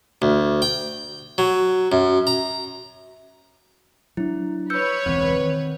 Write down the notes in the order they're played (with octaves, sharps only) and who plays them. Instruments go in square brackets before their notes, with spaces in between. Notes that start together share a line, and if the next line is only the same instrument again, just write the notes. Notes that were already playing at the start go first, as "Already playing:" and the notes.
[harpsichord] D2
G5
F#3
F#2
A#5
[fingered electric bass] F#3 D4 [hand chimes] E4
[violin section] B4 C#5 [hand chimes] E6 G6 C#7
[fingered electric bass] E1 C#2 E3 [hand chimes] C4
[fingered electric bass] D#3